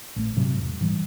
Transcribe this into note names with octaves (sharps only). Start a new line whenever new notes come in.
A1 A3
G#2 C3 F#3
E1
G#2 E3 G3